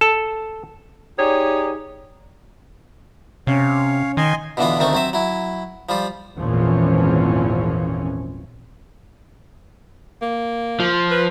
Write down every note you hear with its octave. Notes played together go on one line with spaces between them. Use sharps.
A4
D#4 G4 G#4 C#5 D5
C3 C#4 C#5 F5
D#3 D#5 G#5 C6
B2 D3 E3 B3 F4
D2 D#3 A3 C4 C#6
F#3 C4 E5
F#3 E4
F3 G3 F4
G#1 E2 A#2 E3 F3 C#4
A#3
F3
B4